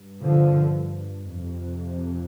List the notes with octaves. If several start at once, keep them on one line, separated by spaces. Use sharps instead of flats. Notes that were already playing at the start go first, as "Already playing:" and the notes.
Already playing: G2
D3 F3
F2 C3